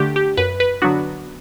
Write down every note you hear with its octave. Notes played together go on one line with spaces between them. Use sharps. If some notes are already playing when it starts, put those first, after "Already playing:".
Already playing: D3 A3 D4 G4
G4
F#2 B4
B4
D3 F#3 B3 D4 F#4